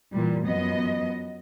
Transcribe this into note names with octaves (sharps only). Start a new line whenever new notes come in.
A#2 E3 G3
F#2 F3 B3 D#5